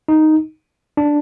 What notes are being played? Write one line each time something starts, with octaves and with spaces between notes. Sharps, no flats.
D#4
D4